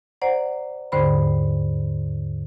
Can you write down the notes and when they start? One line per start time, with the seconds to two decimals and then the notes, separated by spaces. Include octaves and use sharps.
0.22 C5 D5 F#5 A#5
0.92 D#2 G#2 D3 C5 D5 B5